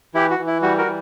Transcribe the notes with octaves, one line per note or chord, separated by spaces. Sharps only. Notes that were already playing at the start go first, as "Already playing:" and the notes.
E3 E4 G4
F#4
E3
E4
G3 F#4
F#4 A#4
E3